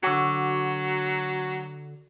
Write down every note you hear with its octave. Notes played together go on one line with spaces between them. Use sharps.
D3 F#3 F#4